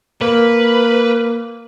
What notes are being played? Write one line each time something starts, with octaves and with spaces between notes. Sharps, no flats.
A#3 B4